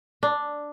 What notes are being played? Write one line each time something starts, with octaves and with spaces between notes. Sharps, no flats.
D4